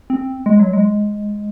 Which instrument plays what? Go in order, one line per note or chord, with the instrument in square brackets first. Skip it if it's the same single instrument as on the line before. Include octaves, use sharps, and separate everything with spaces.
[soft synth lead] C4
G#3
F#3
G#3